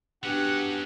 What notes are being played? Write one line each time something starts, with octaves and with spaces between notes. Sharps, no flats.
E3 F#3 B3 C#4 D4 G4 F#5